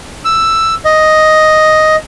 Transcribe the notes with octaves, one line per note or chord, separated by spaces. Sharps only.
E6
D#5